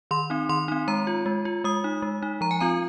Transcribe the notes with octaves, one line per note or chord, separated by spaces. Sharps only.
D#3 C6
C4 D#4
D#3 C6
C4 D#4
G#3 A#5
F4
G#3
F4
G#3 D#6
D#4
G#3
D#4
F3 A#5
G#5
C4 F4 A#5